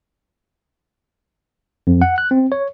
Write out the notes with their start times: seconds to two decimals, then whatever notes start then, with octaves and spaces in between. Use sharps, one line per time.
1.87 F2
2.02 F#5
2.18 F#6
2.31 C4
2.52 C#5